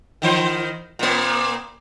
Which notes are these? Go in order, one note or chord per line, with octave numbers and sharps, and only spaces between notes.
D#3 E3 C5
A#2 A#3